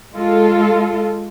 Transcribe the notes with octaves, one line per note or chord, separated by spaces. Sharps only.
G#3 F4 A4